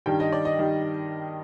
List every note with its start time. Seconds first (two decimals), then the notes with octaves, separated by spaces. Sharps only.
0.06 G2 D#3 G3 G5
0.20 D#5
0.32 D5
0.45 D#5
0.59 D#3 G3